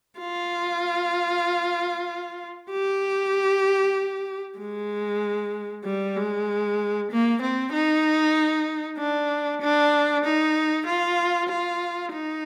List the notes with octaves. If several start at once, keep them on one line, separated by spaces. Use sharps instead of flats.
F4
G4
G#3
G3
G#3
A#3
C4
D#4
D4
D4
D#4
F4
F4
D#4